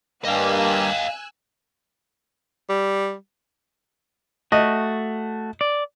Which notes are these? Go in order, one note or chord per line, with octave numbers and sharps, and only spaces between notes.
G2 G3 A#3 D#5 F5 G#5 E6 F#6
G3
A3 F#4 D#5
D5